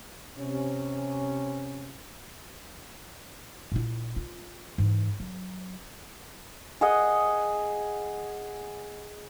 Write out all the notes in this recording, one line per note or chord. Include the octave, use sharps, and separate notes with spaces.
C3 C#4
A#2 E4
F4
G#2 E3
F#3
G#4 D#5 F#5